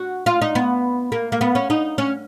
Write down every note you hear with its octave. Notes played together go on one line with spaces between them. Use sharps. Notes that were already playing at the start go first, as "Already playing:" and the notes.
Already playing: F#4
F4
D#4
B3
A#3
A#3
B3
C#4
D#4
C#4